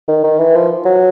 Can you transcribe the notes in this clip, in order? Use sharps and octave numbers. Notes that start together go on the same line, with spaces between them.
D#3
D#3
E3
F3
F#3